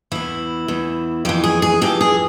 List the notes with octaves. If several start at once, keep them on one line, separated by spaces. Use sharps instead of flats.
E2 E3 E4
E2 E3
F2 E3 G4
G#4
G#4
F2 E3 G4
G#4